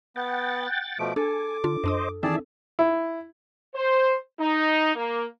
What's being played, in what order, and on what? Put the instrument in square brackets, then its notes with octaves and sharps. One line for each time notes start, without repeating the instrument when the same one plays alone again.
[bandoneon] B3 [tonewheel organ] F#5 G5 A6
[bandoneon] B2 F3 A3 [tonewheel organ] D6
[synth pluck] D4 [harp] A4 [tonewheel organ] G#5 [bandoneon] D6
[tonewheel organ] D3 [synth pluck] D4 F4
[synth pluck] F#2 D4 D#6 [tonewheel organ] C5 D#5
[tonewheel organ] D#3 E3 E5 [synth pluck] C4 D4 [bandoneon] G#4 D5 A5
[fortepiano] E4
[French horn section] C5
D#4
A#3